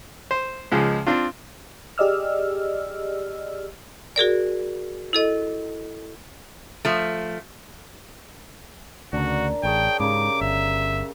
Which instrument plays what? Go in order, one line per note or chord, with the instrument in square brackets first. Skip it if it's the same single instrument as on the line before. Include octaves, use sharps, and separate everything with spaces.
[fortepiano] C5
C#2 F3 G#3
C4 D4 F4
[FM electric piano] G4 G#4 D5 D#5 E6 F6
[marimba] F#4 G#4 A#4 D5
E4 A4 D#5
[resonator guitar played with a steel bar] F3 A3
[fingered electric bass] D2 C#3 [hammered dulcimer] D4 A#4 [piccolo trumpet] F#4
[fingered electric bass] A1 [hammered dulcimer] G#4 C#5 A5 [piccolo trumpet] G5
[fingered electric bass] G#2 [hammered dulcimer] C#3 G4 A#4 [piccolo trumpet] D6
[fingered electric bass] G1 [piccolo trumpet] E5